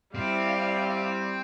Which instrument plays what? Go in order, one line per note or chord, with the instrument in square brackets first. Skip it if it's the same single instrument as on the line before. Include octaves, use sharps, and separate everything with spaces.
[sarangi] G3 [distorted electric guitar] C4 [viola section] E4 D5 F5